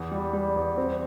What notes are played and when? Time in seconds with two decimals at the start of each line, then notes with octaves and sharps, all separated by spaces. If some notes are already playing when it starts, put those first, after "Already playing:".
Already playing: E2
0.12 G3
0.33 G3
0.56 E2
0.77 C4